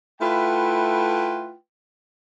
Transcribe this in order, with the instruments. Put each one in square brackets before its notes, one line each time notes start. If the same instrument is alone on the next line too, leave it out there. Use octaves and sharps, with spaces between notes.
[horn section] A3 E4 F4 B4 F#5 G5